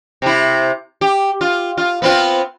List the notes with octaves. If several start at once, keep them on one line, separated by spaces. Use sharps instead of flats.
C3 E4
G4
F4
F4
B3 C4 F4